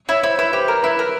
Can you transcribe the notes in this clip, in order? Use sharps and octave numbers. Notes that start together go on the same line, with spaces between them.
E4 C#5
E4 C5
E4 B4
G4 C5
A#4
E4 B4
A#4